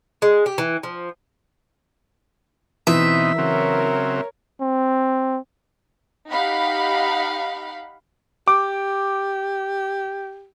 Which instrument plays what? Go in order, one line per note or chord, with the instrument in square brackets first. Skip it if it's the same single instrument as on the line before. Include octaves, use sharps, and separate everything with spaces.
[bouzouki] G#3
G4
E3
F3
[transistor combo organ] B2 C4 D#4 [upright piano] E3 [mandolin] E5
[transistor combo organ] C#3 F#3 C4 [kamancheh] A#4 C#5
[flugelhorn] C4
[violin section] D#4 G4 F5 F#5 B5
[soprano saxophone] G4 [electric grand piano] D6